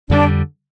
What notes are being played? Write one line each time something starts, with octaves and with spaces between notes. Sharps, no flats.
F2 D3 G3 D4